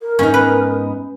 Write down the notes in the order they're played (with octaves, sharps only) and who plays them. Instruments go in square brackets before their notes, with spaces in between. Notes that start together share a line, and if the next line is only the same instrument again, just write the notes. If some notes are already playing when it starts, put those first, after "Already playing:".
[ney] A#4
[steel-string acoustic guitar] G#2 B3 D#4 [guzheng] C#4
[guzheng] B4